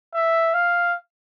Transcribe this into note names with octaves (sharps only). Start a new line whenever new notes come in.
E5
F5